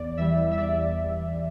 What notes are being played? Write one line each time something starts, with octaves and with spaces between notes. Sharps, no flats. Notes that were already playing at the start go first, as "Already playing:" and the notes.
Already playing: E2 D5
E3 G3 E5
E5
E2 D5